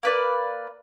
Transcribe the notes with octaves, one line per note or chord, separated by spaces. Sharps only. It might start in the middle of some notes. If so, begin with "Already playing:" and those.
A#3 B4 D5